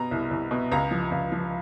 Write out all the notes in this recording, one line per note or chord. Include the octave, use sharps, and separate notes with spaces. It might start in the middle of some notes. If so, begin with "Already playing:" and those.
Already playing: B2 A#5
C2
C2
B2
C#2 A#5
F3
C#2
F3